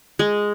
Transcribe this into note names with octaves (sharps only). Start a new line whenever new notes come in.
G#3